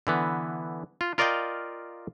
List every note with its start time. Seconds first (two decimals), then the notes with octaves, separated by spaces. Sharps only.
0.07 D3 E3 B3
1.01 F4
1.18 F4 A#4 D5 D#5 F5 G5